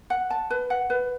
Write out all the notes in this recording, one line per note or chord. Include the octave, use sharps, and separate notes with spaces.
F#5
A5
B4
F#5
B4